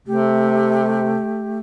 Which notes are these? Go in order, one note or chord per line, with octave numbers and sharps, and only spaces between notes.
C3 A3 G4